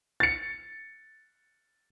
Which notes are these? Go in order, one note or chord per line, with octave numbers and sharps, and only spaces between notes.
A6 C#7